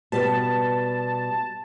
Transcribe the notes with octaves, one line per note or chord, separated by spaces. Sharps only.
B2 G3 A5